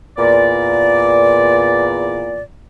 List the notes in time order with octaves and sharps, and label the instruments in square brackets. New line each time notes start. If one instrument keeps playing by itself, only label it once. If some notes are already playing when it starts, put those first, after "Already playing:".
[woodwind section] E2 A#2 D5